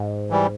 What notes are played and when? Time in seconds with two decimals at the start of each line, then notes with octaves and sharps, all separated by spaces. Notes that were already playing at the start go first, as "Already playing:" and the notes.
Already playing: G#2
0.30 E3 G3